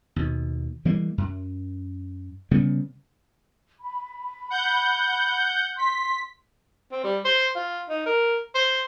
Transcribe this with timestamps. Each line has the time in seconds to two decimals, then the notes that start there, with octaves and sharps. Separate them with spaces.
0.16 D#2 B2
0.85 E3 G3 G#3 A#3
1.18 F#2
2.51 C#3 G3 B3
3.80 B5
4.50 F#5 G6
5.78 C6 B6
6.92 C4
7.04 G3
7.25 C5
7.55 F4
7.90 D#4
8.06 A#4
8.55 C5